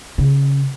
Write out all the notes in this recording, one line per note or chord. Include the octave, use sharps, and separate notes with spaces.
C#3